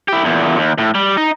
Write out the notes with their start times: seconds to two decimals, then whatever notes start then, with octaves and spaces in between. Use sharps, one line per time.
0.08 E4 G4
0.24 E2 A#2
0.58 D#2
0.78 A2
0.95 G3
1.17 D#4